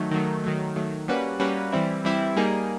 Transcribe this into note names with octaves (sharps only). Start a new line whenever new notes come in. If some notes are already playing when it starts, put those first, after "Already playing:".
Already playing: D#3 F#3 A3
D#3 F#3 A3
D#3 F#3 A3
D#3 F#3 A3
G3 A#3 C#4 F#4 B4
G3 A#3 C#4 F#4 B4
E3 G3 C4 E4
E3 G3 C4 E4
G3 A#3 D#4 G#4